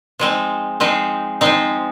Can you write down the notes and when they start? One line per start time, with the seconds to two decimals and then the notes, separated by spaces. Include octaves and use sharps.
0.19 F3 G#3 C4 D#4
0.80 F3 G#3 C4 D#4
1.41 F3 G#3 C4 D#4